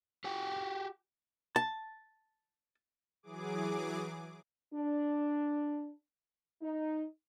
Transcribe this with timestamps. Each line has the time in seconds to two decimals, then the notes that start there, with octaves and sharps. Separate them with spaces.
0.24 F#4 G4 F#5 G5
1.56 A5
3.23 E3 F#3 G#4 D6
4.74 D4
6.62 D#4